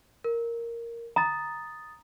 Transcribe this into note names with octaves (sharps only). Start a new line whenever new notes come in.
A#4
A#5 D#6 A6